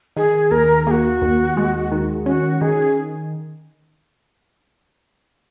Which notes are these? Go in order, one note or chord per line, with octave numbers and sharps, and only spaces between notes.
D#3 G#4
D#2 A#4
A#3 F#4 G#4
D#2
G#3
D#3
C#4 F#4
D#3 G#4